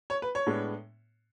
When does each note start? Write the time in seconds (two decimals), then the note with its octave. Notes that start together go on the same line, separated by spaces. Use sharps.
0.10 C#5
0.22 B4
0.35 C#5
0.47 A2 G#3 B3 D4